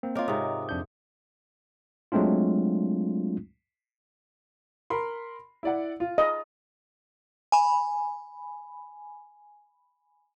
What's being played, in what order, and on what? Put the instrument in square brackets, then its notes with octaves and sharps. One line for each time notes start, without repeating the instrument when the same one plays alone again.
[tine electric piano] A#3 C4
[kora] F4 A#4 [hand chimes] C#5 D#5 D6
[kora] G#2 C3 [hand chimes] C5 D6 D#6 [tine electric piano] A#5
[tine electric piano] F2 D4 G6
F#3 G#3 A3 C4 D4 F4
[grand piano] A#4 B5 C6
E4 D5 F#5
F4
[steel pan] D#5
[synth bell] G#5 B5